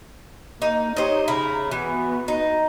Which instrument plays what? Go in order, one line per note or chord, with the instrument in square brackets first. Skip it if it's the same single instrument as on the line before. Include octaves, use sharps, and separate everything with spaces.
[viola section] A#3 [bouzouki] D#4
[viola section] D#4 G4 C#5 [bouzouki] C5 D#5
[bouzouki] C#3 E4 [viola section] A#5
[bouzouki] E3 [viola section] B3 F#4
[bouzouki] D#4